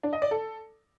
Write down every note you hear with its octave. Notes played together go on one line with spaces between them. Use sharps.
D4
D#5
D5
A4